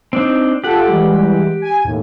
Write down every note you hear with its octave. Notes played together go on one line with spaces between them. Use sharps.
C4 D4 D#4
F4 G4 A4 F#5
E3 G3 G#3
G#5
D#2 A2